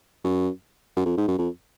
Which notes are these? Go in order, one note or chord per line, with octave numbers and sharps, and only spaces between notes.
F#2
F#2
F2
G#2
F#2
F2